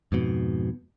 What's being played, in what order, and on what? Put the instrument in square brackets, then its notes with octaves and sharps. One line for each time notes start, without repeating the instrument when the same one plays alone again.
[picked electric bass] F2 G#2 B2